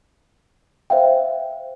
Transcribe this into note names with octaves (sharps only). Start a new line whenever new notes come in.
C5 E5 F5 G5